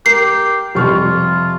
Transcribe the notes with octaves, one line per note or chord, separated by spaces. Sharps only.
G4 A#4 C7
F2 C3 F3 G3 F4 C#6 F6